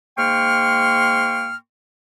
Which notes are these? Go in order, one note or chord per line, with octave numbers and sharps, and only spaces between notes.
G#2 A#3 G5 C6 C#6 F6